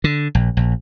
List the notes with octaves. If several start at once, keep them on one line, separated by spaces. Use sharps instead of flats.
D3
A#1
A#1